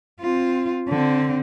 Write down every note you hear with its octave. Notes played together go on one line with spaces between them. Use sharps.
C4 F4
D3 C4